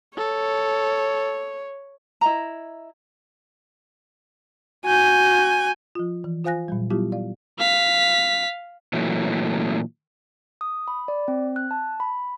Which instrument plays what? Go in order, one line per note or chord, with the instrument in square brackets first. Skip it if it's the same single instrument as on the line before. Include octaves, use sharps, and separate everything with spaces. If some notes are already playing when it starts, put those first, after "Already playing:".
[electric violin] A4 [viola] C#5
[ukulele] E4 D#5 A#5
[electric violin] F#4 G6 [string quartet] G#5
[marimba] F3 F4
E3
F4 C5 F5 G#5 F#6 A#6
A#2 F#3 G3
F#3 G3 B3 E4 F4 G4
D5 F5
[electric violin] F5 B6
[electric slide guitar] A#2 E3 F#3 A3
[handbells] D#6
B5
D5
C4
F#6
A5
B5